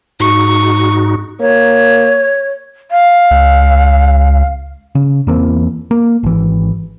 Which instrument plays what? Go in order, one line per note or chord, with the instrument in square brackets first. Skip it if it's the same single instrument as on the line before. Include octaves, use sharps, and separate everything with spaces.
[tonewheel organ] G#2 D#4 F#4 [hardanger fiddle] C#6
[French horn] A#3 [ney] C#5
[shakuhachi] F5
[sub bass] C#2
[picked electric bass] C#3
E2 E3 A#3 C4
A#3
G#1 E3